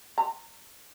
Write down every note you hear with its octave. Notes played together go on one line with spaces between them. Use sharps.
A#5